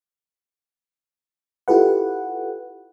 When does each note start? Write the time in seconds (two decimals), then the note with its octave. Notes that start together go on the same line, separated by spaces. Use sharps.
1.68 E4 F4 G4 A4 B4 F#5